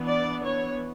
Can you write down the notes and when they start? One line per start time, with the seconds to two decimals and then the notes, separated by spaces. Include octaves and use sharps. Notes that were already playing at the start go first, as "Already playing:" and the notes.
Already playing: E3 B3 D4
0.08 D5
0.44 C#5